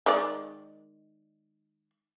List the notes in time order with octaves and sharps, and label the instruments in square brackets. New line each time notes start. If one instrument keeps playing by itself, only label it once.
[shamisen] D#3 G#3 D5